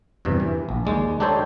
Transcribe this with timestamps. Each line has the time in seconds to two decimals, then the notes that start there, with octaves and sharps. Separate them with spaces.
0.25 E2 G2 C3
0.40 E3
0.69 A#1
0.85 D#2 G#3 D5
1.20 D4 D#4 G4 A4 C5 C#5